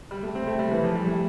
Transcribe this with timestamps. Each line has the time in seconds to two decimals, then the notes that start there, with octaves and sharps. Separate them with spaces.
0.11 G3
0.23 A3
0.35 C4
0.47 A3
0.59 G3
0.71 E3
0.84 F3
0.95 G3
1.07 A3